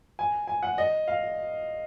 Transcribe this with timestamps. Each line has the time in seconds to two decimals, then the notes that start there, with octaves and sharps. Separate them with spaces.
0.19 G#5
0.47 G#5
0.63 F#5
0.78 D#5
1.08 F5